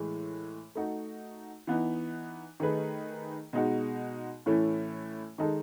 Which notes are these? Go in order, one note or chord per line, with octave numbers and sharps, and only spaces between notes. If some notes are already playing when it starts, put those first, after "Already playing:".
Already playing: A2 E3 G#3
A3 D#4 F#4
E3 B3 D#4
D#3 A3 D#4 G#4 B4
B2 G#3 D#4 F#4
A2 E3 A3 C#4 E4
D#3 G#3 D#4 A4